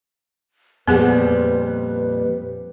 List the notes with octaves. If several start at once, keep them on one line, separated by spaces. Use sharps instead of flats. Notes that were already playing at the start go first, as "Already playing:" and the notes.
F2 A#2 G3 B3 G#4 B4 F#5